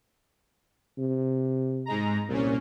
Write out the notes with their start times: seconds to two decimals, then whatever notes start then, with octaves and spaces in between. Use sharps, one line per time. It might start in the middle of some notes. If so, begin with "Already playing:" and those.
0.98 C3
1.86 G#2 G#3 A#5
2.29 C2 A#2 C#4